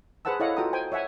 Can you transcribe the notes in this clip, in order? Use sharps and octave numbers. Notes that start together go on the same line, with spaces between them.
G#4 B4 C5 F#5 A5 E6
E4 A4 C#5 D#5 F5 F#5
F4 F#4 A4 G5 A#5 D#6
C5 G5 G#5
C#5 E5 F#5 G#5